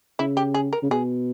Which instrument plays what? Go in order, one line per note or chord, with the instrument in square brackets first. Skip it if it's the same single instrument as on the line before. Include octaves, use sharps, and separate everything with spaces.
[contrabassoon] C#3 [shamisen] E4
[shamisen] G4
G#4
A#4
[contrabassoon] C#3
[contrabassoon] B2 [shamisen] G#4